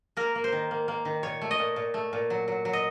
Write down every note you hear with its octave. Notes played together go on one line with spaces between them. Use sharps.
A#3 A#4
A#3
C5
D#3
A#3
A#3
D#3
A#2 C#5
A3
D#5
A#2
A#2
A3
A#2
F#3
F#3
F#3
D#5